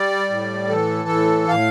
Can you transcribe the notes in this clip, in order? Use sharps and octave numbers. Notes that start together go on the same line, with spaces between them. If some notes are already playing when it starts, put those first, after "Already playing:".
Already playing: G3 D5
A2
E3 A4
A2
A2 F5